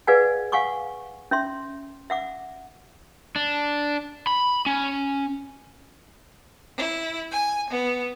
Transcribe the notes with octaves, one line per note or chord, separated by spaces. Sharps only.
G#4 B4 D5 F5 F#5 G#5
F5 F#5 G#5 C#6 D6
C#4 E5 C6
E5 F#5 D6
D4
B5
C#4
E4
G#5
B3